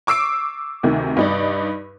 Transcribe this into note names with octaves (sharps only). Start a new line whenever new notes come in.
C#6 D6 E6 C7 D7
D2 C3 D#3
G2 D#4 D5